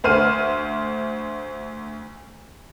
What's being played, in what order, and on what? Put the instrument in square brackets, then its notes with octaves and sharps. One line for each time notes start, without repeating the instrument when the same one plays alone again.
[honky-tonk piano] D2 C5 F6 D#7